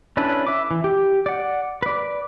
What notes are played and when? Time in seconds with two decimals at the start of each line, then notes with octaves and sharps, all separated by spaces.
0.17 C#4 D4 E4 A4 B4
0.47 E5 D6
0.71 E3
0.84 G4
1.26 D5 F#5
1.82 B4 D5